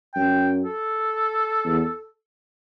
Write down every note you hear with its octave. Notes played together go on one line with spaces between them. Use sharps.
F#2 G5
A4
E2